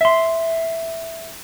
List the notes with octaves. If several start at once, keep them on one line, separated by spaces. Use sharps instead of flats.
E5 C6